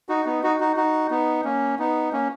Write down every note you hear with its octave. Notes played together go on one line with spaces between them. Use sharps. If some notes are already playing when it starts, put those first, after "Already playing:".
D#4 F#4
B3 D#4
D#4 F#4
D#4 F#4
D#4 F#4
B3 D#4
A#3 C#4
B3 D#4
A#3 C#4